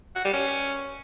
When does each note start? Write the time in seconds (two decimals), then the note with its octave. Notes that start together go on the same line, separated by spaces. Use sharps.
0.16 F#4
0.25 G3
0.33 C#4